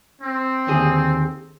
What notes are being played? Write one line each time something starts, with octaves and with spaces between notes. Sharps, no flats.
C4
D#2 D3 G#4